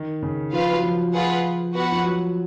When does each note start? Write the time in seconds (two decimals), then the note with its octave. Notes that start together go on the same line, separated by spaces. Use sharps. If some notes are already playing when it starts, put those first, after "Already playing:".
Already playing: D#3
0.23 C#3
0.52 F3 F4 B4 F5
0.73 F#3
0.83 F3
1.13 F4 G#4 B4 F#5
1.74 B3 F#4 B4 F#5
1.92 F3
2.04 F#3